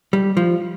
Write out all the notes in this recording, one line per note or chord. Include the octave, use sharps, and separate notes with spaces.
G3
F3